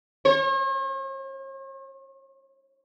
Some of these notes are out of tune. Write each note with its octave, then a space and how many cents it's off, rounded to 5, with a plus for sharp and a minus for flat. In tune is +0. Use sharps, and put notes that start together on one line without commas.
C#5 -45